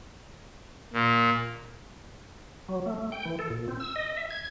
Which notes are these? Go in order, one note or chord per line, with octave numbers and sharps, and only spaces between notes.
A#2
F#3
A3
A3
G5
E3
A4
A#2
C4
E6
D#5
E5
G#6